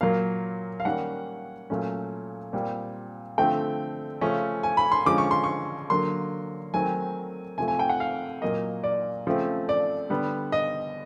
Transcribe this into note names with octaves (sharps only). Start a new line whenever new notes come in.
A#2 F#3 A#3 F5
F5
D#3 G3 A#3 C#4 F#5
A#2 F#3 A3 C#4
A#2 G3 C4
D3 F3 A3 C4 G5
C#3 F3 A3 C#4
G#5
B5
C6
D3 F3 G#3 C#4 D6
C#6
C6
C#6
D3 F#3 A#3 C6
D#3 F#3 A3 C4 G#5
C3 F3 A3 G#5
G#5
G5
F#5
F5
A#2 F#3 A#3 D#5
D5
C#3 F3 A3 C4
D5
D3 G3 B3
D#5